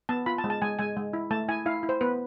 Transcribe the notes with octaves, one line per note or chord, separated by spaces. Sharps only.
B3 A5
F4 B5
A5
G#3
A5
G#3 G#5
G#3 G#5
G#3
E4
A3 A5
E4 G#5
E4 F5
E4
C5
B3 B4